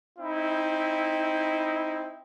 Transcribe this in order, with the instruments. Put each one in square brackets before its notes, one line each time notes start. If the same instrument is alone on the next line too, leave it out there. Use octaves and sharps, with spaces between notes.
[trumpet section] C4 D#4 E4